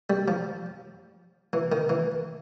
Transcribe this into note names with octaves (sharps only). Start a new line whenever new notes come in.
G3
F3
E3
D#3
E3